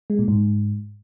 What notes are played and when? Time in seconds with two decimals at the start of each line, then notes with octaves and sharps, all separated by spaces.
0.10 G#3
0.19 A#2
0.28 G#2